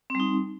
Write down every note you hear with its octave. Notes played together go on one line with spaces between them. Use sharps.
G3 C4 D#4